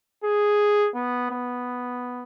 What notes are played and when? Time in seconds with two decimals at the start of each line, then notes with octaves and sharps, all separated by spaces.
0.24 G#4
0.96 B3
1.31 B3